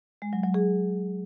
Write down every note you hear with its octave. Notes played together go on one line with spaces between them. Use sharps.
G#3
F#3
F#3
G#4